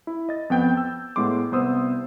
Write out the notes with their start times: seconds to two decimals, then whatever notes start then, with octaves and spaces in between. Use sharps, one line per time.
0.07 E4
0.29 D#5 A6
0.50 F2 B3 G5 G6
0.77 E6
1.16 A2 G#3 B3 C6 D6
1.52 C2 B3 C5 D#6 E6